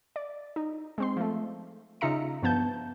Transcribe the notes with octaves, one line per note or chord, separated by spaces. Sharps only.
D5
D#4
G#3 C4 C6
F3 A3
C#3 D#4 F4 E5 A#5 C#7
G2 F3 B3 A5 G6